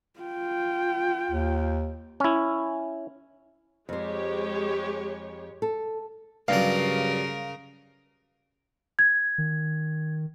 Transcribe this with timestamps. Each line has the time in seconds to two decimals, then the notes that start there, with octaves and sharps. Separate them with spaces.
0.20 F4 G5
1.31 D#2
2.20 C#4 E4
3.89 F2 G#3 G4 C5 C#5
5.62 A4
6.48 G2 C#3 F#3 A#4 F5
8.99 G#6
9.38 D#3